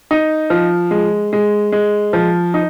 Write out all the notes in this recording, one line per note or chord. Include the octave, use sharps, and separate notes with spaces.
D#4
F3
G#3
G#3
G#3
F3
D#4